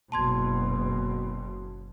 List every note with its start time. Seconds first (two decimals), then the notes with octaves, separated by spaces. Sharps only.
0.12 F#1 B2 A5 C6 G#6